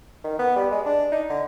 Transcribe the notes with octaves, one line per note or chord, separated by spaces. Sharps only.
D#3
B3
G3
G#3
D4
D#4
D3